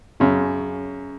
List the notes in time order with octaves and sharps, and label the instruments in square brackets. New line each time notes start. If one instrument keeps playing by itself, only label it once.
[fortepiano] F#2 C#3